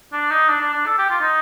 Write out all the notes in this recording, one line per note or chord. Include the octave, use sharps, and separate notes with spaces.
D4
D#4
D4
D4
D4
A4
G4
F4
D#4